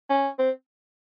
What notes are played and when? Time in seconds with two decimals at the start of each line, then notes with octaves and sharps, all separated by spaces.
0.10 C#4
0.39 C4